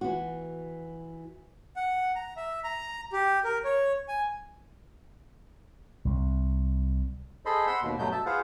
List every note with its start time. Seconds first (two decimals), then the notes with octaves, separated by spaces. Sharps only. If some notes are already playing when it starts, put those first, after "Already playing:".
0.01 E3 F#4
1.76 F#5
2.15 A#5
2.37 E5
2.64 A#5
3.13 G4
3.45 A#4
3.64 C#5
4.08 G#5
6.05 C2
7.46 G#4 A4 C5 D#5 B5 C6
7.67 F#5 B5 C6 E6
7.82 D#2 B2
7.99 G2 B2 F#3 A3 B3 G6
8.12 E5 A5
8.26 F4 G#4 B4 C5 F5 F#5